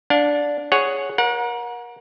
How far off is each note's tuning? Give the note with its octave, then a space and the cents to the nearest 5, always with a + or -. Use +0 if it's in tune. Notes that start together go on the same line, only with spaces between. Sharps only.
D4 -10 F5 +40
G#4 +0 C#5 +0 F#5 +0
A#4 +30 F#5 -30